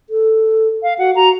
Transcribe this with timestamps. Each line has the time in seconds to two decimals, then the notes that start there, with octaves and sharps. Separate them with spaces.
0.10 A4
0.83 F5
0.99 F#4 F#5
1.16 F#4 A#5